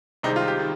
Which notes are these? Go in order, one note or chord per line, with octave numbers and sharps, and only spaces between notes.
C2 C3 D#3 G#3 C4 D#4
F4
G4
D#3